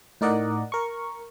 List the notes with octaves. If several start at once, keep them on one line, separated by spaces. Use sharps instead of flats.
A2 D#4 A#4 D5 D#5 F#5
A#4 C#6